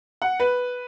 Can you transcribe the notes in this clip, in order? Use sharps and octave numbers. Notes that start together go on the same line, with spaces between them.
F#5
B4